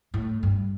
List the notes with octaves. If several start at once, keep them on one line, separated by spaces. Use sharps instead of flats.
A2
G2